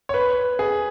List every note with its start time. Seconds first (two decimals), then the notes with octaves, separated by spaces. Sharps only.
0.09 C#5
0.14 B4
0.59 G#4